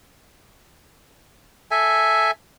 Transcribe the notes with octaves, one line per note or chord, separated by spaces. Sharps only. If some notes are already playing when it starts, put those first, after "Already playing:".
A4 E5 G#5